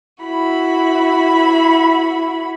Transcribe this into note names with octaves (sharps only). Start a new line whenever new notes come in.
E4 F#4 B5